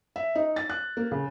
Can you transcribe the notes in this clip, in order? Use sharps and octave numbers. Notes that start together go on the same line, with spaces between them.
E5
D#4
A6
F#6
A#3
C#3